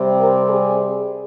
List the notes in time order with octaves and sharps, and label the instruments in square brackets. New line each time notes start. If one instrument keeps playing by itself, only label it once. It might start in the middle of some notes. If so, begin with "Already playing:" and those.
Already playing: [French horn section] C3 G3 C4
A#4
G#4